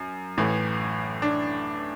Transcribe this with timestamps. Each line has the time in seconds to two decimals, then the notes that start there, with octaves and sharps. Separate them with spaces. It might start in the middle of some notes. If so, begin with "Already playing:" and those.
Already playing: F#2
0.37 A1 A2 E3
1.22 D4